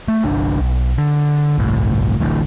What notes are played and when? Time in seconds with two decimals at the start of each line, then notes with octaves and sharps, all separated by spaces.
0.08 A3
0.24 G1 C2 D4
0.60 B1
0.98 D3
1.58 G1 C2 A2
2.20 D1 A1 A2 D3